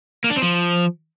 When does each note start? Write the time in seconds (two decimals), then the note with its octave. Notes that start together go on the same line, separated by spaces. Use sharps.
0.24 A#3
0.30 D4
0.36 C4
0.42 F3